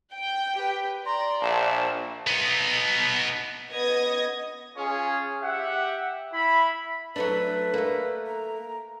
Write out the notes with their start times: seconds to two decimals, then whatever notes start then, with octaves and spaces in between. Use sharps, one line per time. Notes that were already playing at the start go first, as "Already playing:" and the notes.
0.13 G5
0.55 G4 B4
1.06 D5 A#5 C6
1.42 A#1 E5 F5 A5
2.27 B3 D#4
3.73 B3 D#5 D#6 G#6 A#6
4.77 C#4 F4 G#4
5.42 G4 E5 F#5
6.33 E4 B5
7.16 F#3 A3 D4 B4
7.74 A3 A#3
8.26 A#5